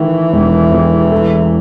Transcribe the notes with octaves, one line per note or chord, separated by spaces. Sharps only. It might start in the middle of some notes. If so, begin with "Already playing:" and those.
Already playing: D#3 E3 A3
E1
E2
A3